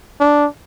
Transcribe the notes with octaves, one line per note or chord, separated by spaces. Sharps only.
D4